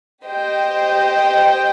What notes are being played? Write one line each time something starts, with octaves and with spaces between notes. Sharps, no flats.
G4 C5 D#5 G5